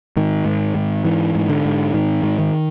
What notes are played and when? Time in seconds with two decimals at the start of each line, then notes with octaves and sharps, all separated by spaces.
0.17 G#2 D#3
0.45 G#2
0.75 G#2
1.05 G#2 E3
1.35 G#2
1.49 D3
1.65 G#2
1.94 G#2 D#3
2.23 G#2
2.39 D#3